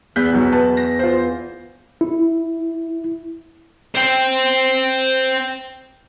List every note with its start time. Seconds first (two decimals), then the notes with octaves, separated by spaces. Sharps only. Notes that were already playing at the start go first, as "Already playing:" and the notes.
0.16 E2 F#6 G6 B6
0.32 B1 F#3
0.52 B4 A5
0.77 A#6
0.99 F4 C5
2.01 E4
3.95 C5 G5